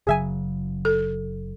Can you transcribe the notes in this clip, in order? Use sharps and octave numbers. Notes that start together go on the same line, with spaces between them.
F#1 C#3 F#3 G#4 E5 G#5
A4